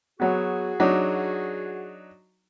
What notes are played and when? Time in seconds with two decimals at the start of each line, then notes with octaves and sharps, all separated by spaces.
0.20 F#3 B3 F#4 G#4
0.80 F#3 D4 D#4